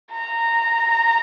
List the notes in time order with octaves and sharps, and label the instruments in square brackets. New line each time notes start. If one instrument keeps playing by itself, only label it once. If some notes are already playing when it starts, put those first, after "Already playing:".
[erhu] A#5